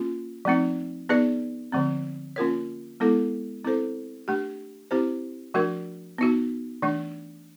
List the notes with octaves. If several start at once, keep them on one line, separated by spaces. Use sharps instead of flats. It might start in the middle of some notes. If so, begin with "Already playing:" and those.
Already playing: A#3 C#4 F4
F3 A3 C4 D#4
B3 D#4 G#4 B4 D5
D3 F3 A3 C4
A#3 C#4 F4 A#4 C#5
G#3 B3 E4 A4
C4 E4 A4 C5
A3 D4 G4
C4 E4 G4 C5
F3 A3 D4 F#4 A#4
B3 D#4 F#4
E3 A3 D4